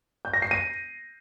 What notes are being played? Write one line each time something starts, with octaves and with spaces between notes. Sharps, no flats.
G6
A#6
C7
D#7